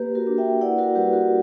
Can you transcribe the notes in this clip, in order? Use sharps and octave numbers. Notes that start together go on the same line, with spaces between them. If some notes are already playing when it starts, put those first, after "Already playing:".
Already playing: A#3 G4 B4
F#4 A#4
D4
E5 G5
E4 D5 F#5
F#4 A#4
G3 G4 B4
F#4 A#4